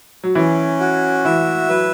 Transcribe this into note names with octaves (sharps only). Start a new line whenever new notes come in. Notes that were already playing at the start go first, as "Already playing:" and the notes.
F#3
E3 C#4
F#4
E3 E5
F#3 B4